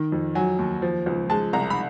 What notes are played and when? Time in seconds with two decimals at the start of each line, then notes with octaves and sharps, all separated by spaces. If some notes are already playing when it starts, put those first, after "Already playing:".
Already playing: D#3
0.12 F2
0.35 F#3 G#5
0.59 D#2
0.82 F3
1.06 C#2
1.30 G#3 A5
1.53 C2 A#5
1.70 B5